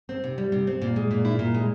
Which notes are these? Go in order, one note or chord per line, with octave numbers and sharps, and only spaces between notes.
C4
C3
G3
C3
C4
A#2
G#3
A#2
E4
A#2
G#3